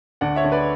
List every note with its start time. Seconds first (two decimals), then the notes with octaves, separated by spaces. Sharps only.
0.21 D2 D5 F#5
0.36 C#5 E5
0.45 D2
0.52 B4 D5